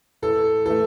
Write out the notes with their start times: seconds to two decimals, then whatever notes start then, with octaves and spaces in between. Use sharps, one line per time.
0.22 A2 A4
0.65 E3 A3 A4